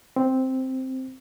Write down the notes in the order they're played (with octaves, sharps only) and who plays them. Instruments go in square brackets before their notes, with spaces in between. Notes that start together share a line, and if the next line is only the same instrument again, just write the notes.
[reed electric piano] C4